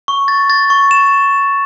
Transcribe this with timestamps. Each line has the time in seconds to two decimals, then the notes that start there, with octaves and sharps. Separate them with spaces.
0.08 C#6
0.28 A6
0.50 A6
0.70 C#6
0.91 E7